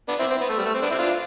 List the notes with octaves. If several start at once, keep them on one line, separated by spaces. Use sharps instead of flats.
B3 D4
C4 E4
C4
B3
A3
G3
A3
C4
B3 D4
C4 E4
D4 F4